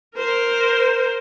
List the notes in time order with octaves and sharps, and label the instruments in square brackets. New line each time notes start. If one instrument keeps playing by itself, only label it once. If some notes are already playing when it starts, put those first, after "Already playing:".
[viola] A#4 C5